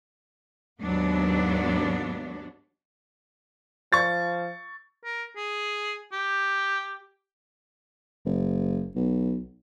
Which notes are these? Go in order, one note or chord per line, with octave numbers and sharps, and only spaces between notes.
D#2 G#2 F#3 B3 D4
F3 C#6 A6
A#4
G#4
G4
F#1
B1